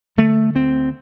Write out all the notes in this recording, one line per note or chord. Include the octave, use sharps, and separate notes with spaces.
D3 A3
D2 C4